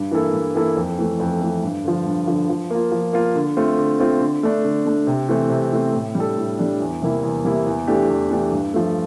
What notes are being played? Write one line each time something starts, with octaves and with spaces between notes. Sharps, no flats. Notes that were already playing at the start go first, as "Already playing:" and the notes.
Already playing: G2
E3 A#3 E4 A4
G2
E3 A#3 E4 A4
F2
E3 A3
F2
E3 A3
G2
D3 F3
G2
D3 F3
F3
A#3 F4
F3
A#3 F4
D3
A3 C4 F4
D3
A3 C4 F4
D3
A3 D4
D3
A3 D4
C3
E3 A3 C4
C3
E3 A3 C4
A2
G3 D4 A4
A2
G3 D4 A4
E2
C3 G3 A#3 E4
E2
C3 G3 A#3 E4
E2
E3 A3 D4 G4
E2
E3 A3 D4 G4
G2
F3 A3